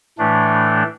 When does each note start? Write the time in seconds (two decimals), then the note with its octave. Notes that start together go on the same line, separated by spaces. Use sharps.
0.18 A2 E3 A3 D4